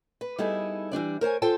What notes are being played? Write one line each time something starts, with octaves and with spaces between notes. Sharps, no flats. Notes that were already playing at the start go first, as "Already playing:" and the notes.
B4
G3 B3 D#4 E4 G#4 A4
E3 G3 D4 D5
A#4 C5 C#5 G#5
F4 A4 C5 G5 A5